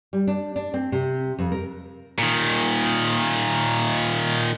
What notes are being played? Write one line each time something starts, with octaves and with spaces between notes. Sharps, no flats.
G3
D4
D4
C4
C3
F2
A#4
A#2 D#3